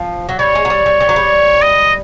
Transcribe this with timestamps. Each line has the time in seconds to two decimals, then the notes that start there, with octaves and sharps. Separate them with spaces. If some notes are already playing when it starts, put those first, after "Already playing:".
Already playing: F3
0.29 F#3
0.39 G3 C#5
0.55 G#3
0.65 F#3
0.70 G3
0.86 G3
1.00 G3
1.09 F#3
1.16 G3
1.62 D#5